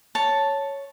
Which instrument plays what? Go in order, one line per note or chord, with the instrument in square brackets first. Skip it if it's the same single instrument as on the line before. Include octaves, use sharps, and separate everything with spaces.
[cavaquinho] C#5 A5